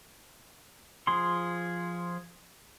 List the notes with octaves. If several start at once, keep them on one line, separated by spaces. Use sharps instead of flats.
F3 G#4 C6